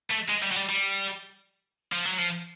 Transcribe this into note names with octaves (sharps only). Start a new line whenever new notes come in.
A3
G#3
G3
F#3
G3
G3
F3
F#3
F3